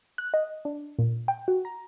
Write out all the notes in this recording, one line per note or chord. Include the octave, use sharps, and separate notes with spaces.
F#6
D#5
D4
A#2
G5
F#4
A#5